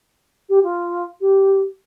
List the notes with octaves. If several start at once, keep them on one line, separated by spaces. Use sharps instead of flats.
G4
F4
G4